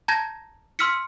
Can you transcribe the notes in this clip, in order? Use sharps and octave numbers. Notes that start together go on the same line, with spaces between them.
A5 A#5 G6 G#6 A#6
C6 E6 F6 B6 C#7